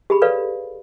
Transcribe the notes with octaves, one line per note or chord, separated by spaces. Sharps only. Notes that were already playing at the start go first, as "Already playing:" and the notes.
G4 G#4 B5
A4 B4 C#5 D5 F5